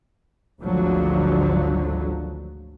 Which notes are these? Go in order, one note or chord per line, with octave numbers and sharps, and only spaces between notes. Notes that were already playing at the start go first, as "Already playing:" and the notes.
G#1 D2 G#2 D3 F3 F#3